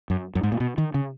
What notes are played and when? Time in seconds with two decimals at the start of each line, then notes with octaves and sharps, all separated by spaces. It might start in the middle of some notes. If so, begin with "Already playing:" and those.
0.10 F#2
0.35 F#2
0.43 G#2
0.52 A#2
0.60 B2
0.78 D#3
0.94 C#3